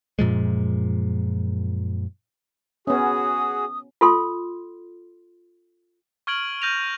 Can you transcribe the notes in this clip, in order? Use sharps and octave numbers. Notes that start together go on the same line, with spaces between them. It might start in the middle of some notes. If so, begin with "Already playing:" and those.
F#2 A#2 F3 G#3
B3 C#4 F#4 G#4 D#6
F4 A4 C6
C#6 F6 G#6 D7 F#7
F6 G6 A#6 D#7 F7